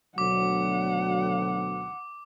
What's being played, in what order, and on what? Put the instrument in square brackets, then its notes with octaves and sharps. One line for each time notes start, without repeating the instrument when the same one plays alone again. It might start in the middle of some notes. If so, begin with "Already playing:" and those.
[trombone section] D2 [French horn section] B2 F#3 [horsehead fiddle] F#5 [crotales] D6